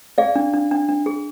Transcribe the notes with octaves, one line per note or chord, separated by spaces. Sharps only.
G#4 D5 F5
D4
D4
D4
D4
G#4